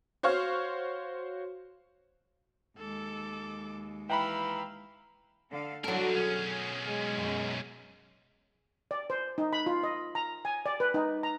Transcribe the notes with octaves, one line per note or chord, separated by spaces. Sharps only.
F#4 C5 C#5 F5 C#6 F6
D#2 G#3 A4 D6
E3 F5 G5 A#5 B5 E6
D3 A4 F5
D3 F#3 D4 E4 F#4 A4 A#4
B1 C#4 G#4
G#3
F#2 F#3
D5
C5
D#4
B5
F4
D#5
A#5
G#5
D5
B4
D#4
A#5